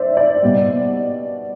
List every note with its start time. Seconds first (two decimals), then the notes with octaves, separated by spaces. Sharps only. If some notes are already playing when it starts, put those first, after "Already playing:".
Already playing: C5 D5 E5
0.17 D5
0.42 B2 G3